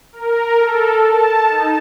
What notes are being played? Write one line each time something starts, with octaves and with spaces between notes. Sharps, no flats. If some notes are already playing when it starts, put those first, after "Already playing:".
A#4
A4
A5
D#4